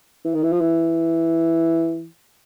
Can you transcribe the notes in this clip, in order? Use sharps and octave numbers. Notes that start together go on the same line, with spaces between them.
E3
D#3
E3
F3
E3